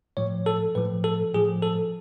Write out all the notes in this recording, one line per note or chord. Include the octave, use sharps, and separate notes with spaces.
A2 F3 C#5
A4
A2 F3 B4
A4
A2 F3 G#4
A4